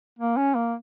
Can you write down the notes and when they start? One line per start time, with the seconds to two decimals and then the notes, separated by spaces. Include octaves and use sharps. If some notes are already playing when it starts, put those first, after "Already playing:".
0.19 A#3
0.37 C#4
0.55 A#3